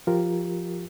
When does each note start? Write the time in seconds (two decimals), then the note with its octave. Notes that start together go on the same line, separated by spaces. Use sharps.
0.07 F3 F4 G4 A#4